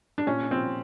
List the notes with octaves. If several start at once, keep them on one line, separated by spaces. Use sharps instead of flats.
D4
A#2 C#4
F3 C4